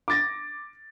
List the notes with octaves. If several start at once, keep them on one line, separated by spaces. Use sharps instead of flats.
D6 A6 A#6